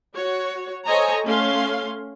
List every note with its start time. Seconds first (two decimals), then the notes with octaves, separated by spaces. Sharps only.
0.17 F#4 C#5
0.86 A4 C5 C#5 D#5 G#5 A#5
1.26 A3 C#4 F5 C6